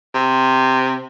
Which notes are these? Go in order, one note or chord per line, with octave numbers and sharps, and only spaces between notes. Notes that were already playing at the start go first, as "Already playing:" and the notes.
C3